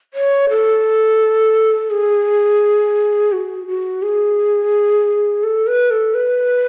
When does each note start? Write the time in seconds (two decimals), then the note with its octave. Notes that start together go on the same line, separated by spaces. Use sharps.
0.14 C#5
0.50 A4
1.91 G#4
3.32 F#4
3.67 F#4
4.03 G#4
5.43 A4
5.67 B4
5.91 A4
6.14 B4